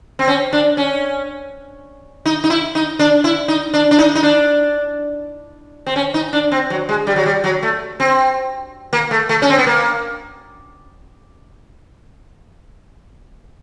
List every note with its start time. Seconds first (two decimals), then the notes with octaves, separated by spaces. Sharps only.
0.19 C4
0.28 C#4
0.53 D4
0.77 C#4
2.26 D#4
2.44 D#4
2.50 E4
2.75 D#4
2.99 D4
3.24 E4
3.48 D#4
3.74 D4
3.91 D4
3.99 D#4
4.15 D#4
4.23 D4
5.86 C4
5.96 C#4
6.14 D#4
6.33 D4
6.52 C4
6.70 F#3
6.89 G#3
7.07 G3
7.16 F#3
7.26 G3
7.44 F#3
7.63 A3
8.00 C4
8.93 A#3
9.11 A3
9.29 A3
9.42 C#4
9.50 C4
9.58 B3
9.67 A#3